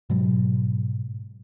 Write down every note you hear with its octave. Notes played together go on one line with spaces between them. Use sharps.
G#2 B2 F#3